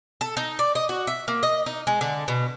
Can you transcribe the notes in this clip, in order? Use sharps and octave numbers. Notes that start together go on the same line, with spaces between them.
A4
D#4
D5
D#5
F#4
E5
A#3
D#5
D#4
G#3
D3
B2